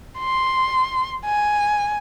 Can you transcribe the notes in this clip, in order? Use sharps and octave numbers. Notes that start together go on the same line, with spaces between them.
C6
G#5